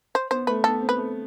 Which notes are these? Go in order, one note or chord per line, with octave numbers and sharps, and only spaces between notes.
C5
B3 C5
A3 B4
B3 A4
C4
B4
A3